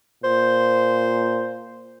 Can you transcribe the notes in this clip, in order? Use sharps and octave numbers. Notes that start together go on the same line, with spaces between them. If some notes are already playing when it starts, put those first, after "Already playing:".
A#2 C5